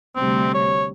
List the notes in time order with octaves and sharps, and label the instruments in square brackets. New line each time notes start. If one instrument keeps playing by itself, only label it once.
[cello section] D2 C3 G3 [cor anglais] C4
[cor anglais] C#5